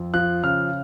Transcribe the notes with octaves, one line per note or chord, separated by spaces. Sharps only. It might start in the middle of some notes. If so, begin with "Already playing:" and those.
Already playing: F2
F3 F#6
C#3 F6